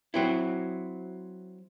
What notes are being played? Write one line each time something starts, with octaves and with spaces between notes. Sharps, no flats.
F#3 C4 E4